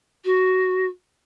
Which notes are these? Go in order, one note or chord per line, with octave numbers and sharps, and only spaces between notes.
F#4